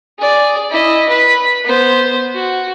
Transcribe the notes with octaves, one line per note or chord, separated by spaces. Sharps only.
G#4 D5
E4 D#5
B4 B5
B3 C5
F#4